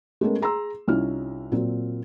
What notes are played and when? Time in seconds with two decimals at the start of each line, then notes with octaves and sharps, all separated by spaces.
0.21 G#3 A3 B3 C#4 A4 A#4
0.41 G#4 A#5 C6 E6
0.88 C2 C#4 D#4 F4 F6
1.52 A#2 F#3 C4